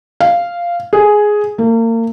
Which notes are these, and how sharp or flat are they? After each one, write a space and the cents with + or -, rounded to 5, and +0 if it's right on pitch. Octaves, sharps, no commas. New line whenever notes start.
F5 -10
G#4 +5
A#3 -35